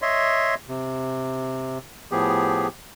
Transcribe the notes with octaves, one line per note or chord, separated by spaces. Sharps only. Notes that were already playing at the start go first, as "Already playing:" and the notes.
C#5 D#5 E5 C6
C3
A2 F3 B3 G4 G#4